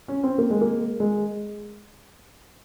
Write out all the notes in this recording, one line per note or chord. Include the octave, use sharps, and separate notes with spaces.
C#4
C4
A#3
G#3
A#3
G#3